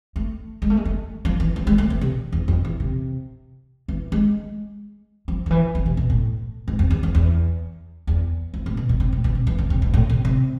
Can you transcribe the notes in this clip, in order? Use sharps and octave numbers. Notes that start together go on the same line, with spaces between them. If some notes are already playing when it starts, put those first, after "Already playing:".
A3
G#3
A3
G#3
A3
F3
E3
F3
G#3
A3
E3
C3
E2
F2
E2
C3
E3
G#3
F3
D3
E3
E3
C3
B2
A2
G#2
F2
E2
E2
E2
E2
F2
A2
B2
B2
C3
A2
B2
C3
E3
D3
C3
B2
A2
C3
C3